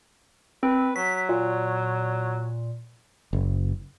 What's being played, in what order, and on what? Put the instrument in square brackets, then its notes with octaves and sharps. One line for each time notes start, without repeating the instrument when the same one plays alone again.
[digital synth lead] C4 [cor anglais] B4
[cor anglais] F#3 [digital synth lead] B6
[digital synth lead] A#2
[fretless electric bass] F#1